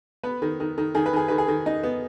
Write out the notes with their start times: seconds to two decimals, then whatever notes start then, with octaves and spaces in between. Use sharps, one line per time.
0.23 B3 B4
0.42 D#3
0.60 D#3
0.78 D#3
0.95 D#3 G#4
1.06 B4
1.13 D#3 G#4
1.28 D#3 B4
1.38 G#4
1.48 D#3
1.66 D#4
1.83 B3